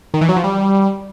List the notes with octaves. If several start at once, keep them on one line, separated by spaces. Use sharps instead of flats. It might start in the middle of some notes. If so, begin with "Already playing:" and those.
D#3
E3
F#3
F3
G3